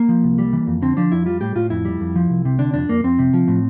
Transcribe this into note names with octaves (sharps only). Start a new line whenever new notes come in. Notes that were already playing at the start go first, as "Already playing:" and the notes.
Already playing: A#3
F3
C2
G3
E3
F2
D3 C4
F3 D4
F2 E4
G3 F4
A2 G4
A2 F4
F2 E4
G3
F2
F3
C2
C3
D3 D4
F2 D4
F2 A#3
F2 C4
C3
F3
A2